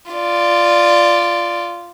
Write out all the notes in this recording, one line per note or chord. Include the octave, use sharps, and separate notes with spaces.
F4 D5